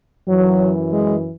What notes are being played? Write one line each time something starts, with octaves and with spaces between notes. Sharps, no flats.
F#2 E3 F#3
G#3